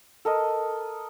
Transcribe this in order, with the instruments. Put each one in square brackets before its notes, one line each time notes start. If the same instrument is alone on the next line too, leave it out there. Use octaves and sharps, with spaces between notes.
[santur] A4 A#4 D#5